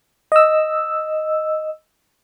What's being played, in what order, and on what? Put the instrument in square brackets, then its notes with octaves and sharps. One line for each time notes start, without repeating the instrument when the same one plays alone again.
[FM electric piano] D#5 E6